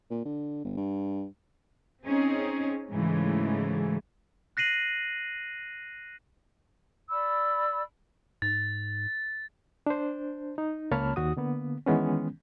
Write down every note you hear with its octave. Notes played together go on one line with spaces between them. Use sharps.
A#2
D3
G1
G2
C4 C#4 D#4 G#4
G#2 C#3 E3 F#3 G#3 A3
F#6 A#6 C7 D#7 F#7
D5 B5 E6
G#2 A6
D4 C5
D#4
C#2 A#3 C#5 A5 B5 F6
D#2 F#4 D#6
D3 A#3 B3
D#3 E3 G#3 B3 C#4